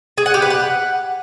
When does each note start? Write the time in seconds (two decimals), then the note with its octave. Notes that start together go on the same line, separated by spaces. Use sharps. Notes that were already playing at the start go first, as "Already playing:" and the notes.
0.18 G#4
0.26 F#5
0.34 G4
0.42 B4
0.50 F#5